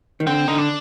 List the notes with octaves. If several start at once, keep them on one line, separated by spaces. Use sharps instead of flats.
D#3
D3 C4
D3 D#4
D4